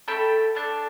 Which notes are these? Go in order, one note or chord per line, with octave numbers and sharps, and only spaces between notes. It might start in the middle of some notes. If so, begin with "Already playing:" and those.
A3 D4 A4 G5 B5
A3 D4 A4